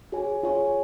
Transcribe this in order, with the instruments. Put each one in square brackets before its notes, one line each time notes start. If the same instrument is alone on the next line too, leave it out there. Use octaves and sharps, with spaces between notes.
[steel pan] F#4 [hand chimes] G#4 C#5 G#5
[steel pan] F4 [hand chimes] G#4 C#5 G#5